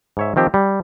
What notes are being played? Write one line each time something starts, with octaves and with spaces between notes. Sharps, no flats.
G#2 C#5 E5
D#3 F3 C4 G4
G3